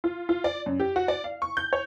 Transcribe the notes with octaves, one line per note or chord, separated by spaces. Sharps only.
F4
F4
D5
F#2
G4
F#4
D5
F5
C#6
G6
C#5